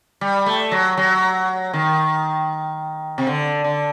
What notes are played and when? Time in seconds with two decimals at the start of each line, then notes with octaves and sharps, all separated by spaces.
0.21 G3
0.46 A3
0.72 F#3
0.97 F#3
1.73 D#3
3.18 C3
3.27 D3
3.64 D3